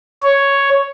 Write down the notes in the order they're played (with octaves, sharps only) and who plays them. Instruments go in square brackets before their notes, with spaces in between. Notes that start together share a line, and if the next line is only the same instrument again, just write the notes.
[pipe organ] C#5